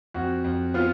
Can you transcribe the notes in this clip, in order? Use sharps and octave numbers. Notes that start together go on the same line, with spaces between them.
F2 F#4
F2
B3 F4